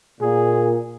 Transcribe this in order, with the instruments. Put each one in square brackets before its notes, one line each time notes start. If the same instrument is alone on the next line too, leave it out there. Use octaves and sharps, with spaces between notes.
[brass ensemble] A#2 [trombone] G#4